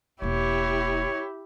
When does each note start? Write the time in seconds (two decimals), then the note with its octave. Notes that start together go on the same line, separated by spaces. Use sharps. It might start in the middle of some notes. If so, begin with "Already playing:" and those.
0.22 E1 A#3 E4 G4 C#5